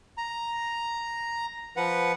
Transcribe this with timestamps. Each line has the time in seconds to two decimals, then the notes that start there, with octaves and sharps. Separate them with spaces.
0.18 A#5
1.77 F3 B4 F#5